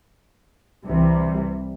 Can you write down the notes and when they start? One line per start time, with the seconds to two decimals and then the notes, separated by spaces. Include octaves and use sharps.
0.86 C2 C3 E3 G3